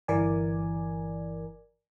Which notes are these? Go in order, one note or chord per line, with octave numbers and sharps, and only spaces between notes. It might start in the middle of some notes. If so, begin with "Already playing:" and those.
G1 E3 A#4 D5 G#5